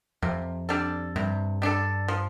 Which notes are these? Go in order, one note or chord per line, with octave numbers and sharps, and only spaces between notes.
F2 C3
G3 D4 A4
G2 C3
G3 D4 A4
F3